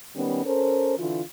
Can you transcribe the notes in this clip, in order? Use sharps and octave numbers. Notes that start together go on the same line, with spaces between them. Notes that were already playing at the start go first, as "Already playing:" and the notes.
D#3 G3 B3 C#4
C#4 A4 A#4 C5
D3 E3 F4